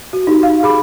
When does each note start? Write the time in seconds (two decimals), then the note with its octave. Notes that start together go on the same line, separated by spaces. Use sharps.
0.13 F#4
0.27 D#4 G4
0.43 F5
0.63 G#4 B5 D6